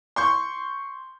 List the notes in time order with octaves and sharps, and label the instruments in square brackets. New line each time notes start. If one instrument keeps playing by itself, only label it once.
[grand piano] C6 C#6 G6